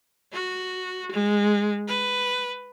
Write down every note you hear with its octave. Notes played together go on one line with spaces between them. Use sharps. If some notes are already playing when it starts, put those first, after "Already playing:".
F#4
G#3
B4